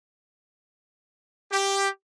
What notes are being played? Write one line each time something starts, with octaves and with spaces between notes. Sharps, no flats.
G4